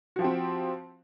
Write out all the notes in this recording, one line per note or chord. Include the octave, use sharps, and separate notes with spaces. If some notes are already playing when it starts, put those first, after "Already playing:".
F3 C4 F#4 G4